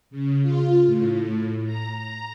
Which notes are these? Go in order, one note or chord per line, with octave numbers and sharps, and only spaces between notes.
C#3
F4
A2
A#5
A#5